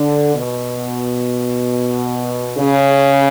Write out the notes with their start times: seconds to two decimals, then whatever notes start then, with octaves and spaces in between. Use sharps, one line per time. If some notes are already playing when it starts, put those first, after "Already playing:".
Already playing: D3
0.35 B2
2.57 C#3